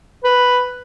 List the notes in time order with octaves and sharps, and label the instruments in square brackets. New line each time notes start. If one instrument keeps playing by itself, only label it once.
[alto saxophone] B4